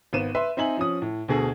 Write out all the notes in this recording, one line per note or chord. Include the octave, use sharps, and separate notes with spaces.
G#1 B3 D#7 E7
B4 E5 C6
C4 D#4 E5 G#5 F#7
F3 C#4 D#6
A2
D2 B2 G#4 A4